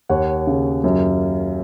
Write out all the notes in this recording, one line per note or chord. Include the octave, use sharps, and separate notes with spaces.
D#2 C#5 F#5
C#3
F#2